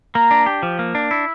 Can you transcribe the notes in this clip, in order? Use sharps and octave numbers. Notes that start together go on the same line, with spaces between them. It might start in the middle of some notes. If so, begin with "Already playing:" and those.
A#3 A#5
D4
G4
F3
A#3
D4
E4